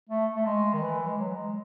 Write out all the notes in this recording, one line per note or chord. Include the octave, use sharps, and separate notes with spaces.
A3
A3
G#3
D#3
E3
G#3
F#3
G#3